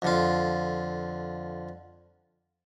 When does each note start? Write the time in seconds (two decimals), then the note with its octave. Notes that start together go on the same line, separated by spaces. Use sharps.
0.02 F2 D3 F4